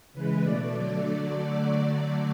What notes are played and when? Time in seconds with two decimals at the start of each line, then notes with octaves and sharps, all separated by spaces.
0.13 C#3 E3 G#3 B4
0.43 B2 A3 D5
0.72 D3 F#3 A3 D5